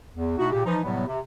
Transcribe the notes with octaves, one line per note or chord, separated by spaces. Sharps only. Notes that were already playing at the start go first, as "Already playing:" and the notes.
E2
B2 A3 D#4 E4 F#4
A#2 C#3 G4
E3 F3 D#4
A2 C3 F#3 G3 B3
C3